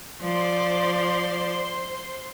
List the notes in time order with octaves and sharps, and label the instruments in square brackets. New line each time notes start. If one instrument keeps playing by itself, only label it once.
[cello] F3 D5 [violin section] C5 C6